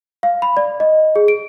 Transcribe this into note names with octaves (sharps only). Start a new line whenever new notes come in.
F5
B5
D5
D#5
G#4
D7